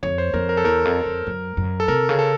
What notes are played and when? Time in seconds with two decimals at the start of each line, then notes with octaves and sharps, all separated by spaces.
0.03 F2 C#5
0.18 C5
0.34 F2 A#4
0.49 A#4
0.57 A4
0.64 E2 A#4
0.85 F2
1.06 F2
1.27 F#2
1.57 F#2
1.80 A4
1.88 C3 A#4
2.09 C#3
2.19 A4